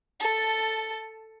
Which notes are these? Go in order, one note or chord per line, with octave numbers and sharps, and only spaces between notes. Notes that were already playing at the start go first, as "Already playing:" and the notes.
A4 A5